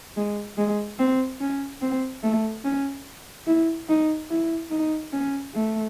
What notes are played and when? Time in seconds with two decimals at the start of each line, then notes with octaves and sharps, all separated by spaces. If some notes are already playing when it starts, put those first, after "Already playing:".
0.17 G#3
0.58 G#3
0.99 C4
1.41 C#4
1.82 C4
2.23 A3
2.64 C#4
3.47 E4
3.89 D#4
4.30 E4
4.71 D#4
5.13 C#4
5.54 A3